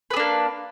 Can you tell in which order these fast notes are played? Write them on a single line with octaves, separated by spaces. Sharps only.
B4 G#4 D4 A#3